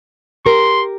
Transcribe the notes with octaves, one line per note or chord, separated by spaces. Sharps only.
G4 A#4 C6